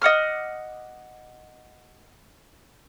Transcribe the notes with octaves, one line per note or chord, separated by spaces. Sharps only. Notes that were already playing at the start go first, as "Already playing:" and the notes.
D#5 F#5 D6 F6